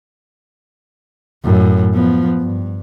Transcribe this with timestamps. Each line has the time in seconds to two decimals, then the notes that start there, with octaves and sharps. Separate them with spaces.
1.44 F#2 A2
1.94 F3 B3
2.38 G2